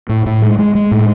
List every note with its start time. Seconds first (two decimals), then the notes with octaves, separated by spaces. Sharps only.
0.09 A2
0.26 A2
0.42 G#3
0.59 G#3
0.75 G#3
0.91 A2